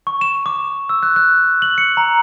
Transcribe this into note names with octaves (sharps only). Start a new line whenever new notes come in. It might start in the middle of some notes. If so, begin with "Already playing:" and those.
C#6
E7
D6
E6
F#6
F#6
F#7
C#7
A#5